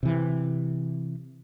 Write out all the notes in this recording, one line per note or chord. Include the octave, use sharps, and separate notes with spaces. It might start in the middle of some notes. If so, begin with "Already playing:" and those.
C3 E3